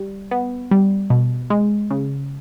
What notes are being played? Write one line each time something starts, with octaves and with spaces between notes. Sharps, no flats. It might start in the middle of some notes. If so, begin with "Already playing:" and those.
Already playing: G3
B3
G3
B2
G#3
C#3